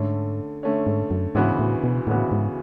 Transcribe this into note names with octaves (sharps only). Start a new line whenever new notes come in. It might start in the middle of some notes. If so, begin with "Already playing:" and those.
Already playing: G#2 D3 A3 C#4
D3 A3 C#4
G#2
F#2
D2 G#2 C#3 E3 B3 F#4
A2
B2
D2 A2 C#3 E3 B3 F#4
G#2